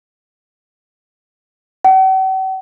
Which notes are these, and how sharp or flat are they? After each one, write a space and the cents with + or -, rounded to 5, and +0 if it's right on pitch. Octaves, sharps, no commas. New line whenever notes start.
F#5 +45